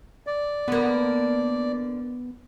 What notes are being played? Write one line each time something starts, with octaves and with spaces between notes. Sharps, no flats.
D5
D3 A#3 B3